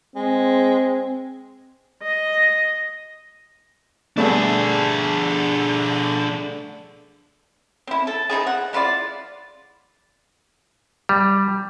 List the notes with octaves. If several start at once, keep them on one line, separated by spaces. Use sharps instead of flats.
G#3 C4
D#5
D3 G3 A3 B3 D4 G#4
C4 E4
A4
C4 D#4 E4 G#4
F#5
G#3 E4 F4 D5
G3